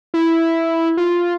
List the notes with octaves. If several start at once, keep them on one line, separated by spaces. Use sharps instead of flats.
E4
F4